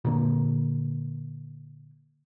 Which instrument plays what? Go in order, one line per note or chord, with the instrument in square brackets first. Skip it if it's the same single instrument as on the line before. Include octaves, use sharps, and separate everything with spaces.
[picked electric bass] A#2 D3 A#3